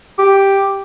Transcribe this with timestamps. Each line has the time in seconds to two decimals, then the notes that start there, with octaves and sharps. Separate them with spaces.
0.19 G4